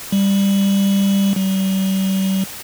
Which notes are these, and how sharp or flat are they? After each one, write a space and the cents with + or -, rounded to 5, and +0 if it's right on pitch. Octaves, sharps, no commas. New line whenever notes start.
G3 +10
G3 -40